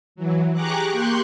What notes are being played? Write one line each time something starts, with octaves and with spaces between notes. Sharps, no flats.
E3 F#3
G4 G#4 A#5 C#6 D6 F#6
A#3 G4 C6 C#6 F#6 G6